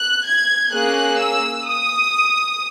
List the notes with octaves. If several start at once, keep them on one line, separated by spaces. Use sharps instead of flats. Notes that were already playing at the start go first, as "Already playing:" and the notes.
Already playing: F#6
G#6
A#3 C#4 G#4 F#6
E6
D#6